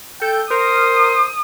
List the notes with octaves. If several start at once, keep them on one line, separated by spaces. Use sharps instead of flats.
A4 G5 G6
A#4 C5 D#6